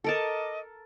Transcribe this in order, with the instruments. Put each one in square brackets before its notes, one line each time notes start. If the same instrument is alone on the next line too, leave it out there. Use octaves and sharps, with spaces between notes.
[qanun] A4 A#4 A5 [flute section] D#5 D6